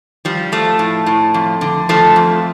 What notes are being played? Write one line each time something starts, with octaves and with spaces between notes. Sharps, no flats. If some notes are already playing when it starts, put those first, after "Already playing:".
F3 G3
F3 A3
A2
A2
F2
D3
F3 A3
F2